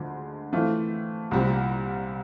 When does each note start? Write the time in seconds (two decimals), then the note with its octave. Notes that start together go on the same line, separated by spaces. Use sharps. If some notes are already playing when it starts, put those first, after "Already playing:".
Already playing: D2 D3 F3 G#3
0.53 E3 A3 C4 F4
1.31 C2 A#2 G3 C4